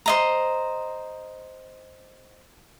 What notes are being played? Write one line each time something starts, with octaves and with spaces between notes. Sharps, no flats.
C5 D#5 A#5